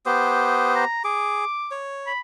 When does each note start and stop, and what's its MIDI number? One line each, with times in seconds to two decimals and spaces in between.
0.06 0.85 59
0.06 0.85 67
0.06 0.85 72
0.06 0.75 87
0.76 1.04 82
1.04 1.45 68
1.04 1.79 86
1.71 2.12 73
2.07 2.20 83